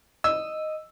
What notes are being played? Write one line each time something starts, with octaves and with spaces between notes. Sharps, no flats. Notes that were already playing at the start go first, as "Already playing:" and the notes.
D#5 E6